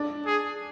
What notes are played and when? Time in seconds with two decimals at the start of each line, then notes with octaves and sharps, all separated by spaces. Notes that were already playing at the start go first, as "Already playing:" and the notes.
Already playing: D4
0.26 G#4